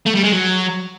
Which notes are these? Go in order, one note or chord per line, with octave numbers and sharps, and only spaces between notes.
A3
G3
G#3
F#3